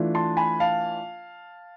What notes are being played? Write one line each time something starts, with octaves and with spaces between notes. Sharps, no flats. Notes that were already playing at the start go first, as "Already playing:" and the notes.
Already playing: E3 A3 D4 F4
A5 C6
G#5 B5
F5 A5